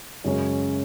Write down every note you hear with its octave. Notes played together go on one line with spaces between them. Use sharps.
F#2 C#3 G#3 C#4 G#4